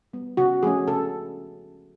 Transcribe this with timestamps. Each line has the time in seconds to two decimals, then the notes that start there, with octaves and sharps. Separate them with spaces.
0.13 G3 B3
0.37 C#3 F#4
0.63 F3 A3 C#4 G#4
0.88 C#3 A4